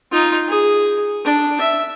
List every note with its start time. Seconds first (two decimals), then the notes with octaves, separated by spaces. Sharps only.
0.12 D#4 F4
0.48 G#4
1.25 D4
1.61 E5